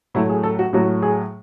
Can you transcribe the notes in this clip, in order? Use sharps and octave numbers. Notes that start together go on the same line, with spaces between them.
A2 F#3 A3 E4
G#4
A4
F#4
A2 F#3 A3 F#4
G#4